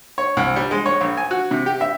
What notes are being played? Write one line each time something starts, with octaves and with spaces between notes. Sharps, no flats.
C#5
C2
G3
G#3
C#5
A#1
G#5
F#4
C3
G4
E5